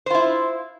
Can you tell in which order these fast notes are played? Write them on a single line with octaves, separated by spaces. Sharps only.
C5 F4 E4